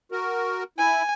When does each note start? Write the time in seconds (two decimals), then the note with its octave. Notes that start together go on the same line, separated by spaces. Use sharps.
0.12 F#4 A#4
0.78 E4 G#5